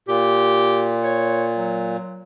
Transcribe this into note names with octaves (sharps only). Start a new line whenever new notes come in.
A#2 G4
C#5
F#3